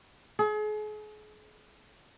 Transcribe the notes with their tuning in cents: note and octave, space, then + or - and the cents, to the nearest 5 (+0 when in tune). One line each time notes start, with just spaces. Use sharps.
G#4 +40